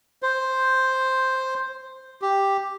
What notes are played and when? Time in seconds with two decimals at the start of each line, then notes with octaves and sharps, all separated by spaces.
0.22 C5
2.22 G4